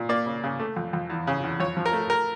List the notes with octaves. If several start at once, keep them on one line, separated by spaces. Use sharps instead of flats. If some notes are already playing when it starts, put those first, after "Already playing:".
Already playing: A#2
A#3 D5
C#3
C#3
A3
F2
F2
E2
C#3
E2
F2 C#5
F3
A#4
A3
A#4